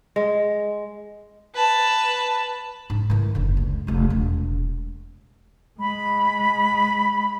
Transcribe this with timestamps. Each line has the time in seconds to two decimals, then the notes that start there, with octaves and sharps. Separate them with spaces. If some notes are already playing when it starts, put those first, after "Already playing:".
0.16 G#3
1.55 B4 A5
2.90 G#2
3.10 D#3 E3
3.35 F#1 D3
3.57 C#2
3.87 F1 D2
4.10 E1
5.80 G#3 B5